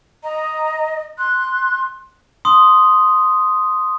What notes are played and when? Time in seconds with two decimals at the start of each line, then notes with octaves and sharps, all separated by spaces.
0.24 D#5 A#5
1.18 C6 F#6
2.45 C6 D#6